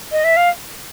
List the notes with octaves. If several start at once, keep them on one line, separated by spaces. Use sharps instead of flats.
D#5
E5
F5